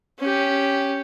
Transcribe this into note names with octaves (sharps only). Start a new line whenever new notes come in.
C#4 G4